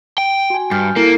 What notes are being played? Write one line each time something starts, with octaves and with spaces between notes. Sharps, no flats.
G5
F#4 G#5
G2 F6 G6 A6
A#3 E4 A4